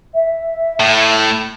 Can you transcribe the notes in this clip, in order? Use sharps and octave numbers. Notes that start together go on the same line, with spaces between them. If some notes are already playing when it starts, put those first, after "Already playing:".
E5
A2